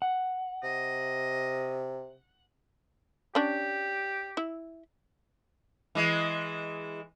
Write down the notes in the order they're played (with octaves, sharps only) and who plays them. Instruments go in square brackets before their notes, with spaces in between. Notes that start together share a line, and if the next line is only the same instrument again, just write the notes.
[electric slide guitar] F#5
[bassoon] C3 [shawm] D#5
[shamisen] C#4 D4 [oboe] G4
[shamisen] E4
[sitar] E3 G#3